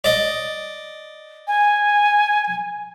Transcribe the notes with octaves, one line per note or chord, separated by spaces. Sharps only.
D5 D#5
G#5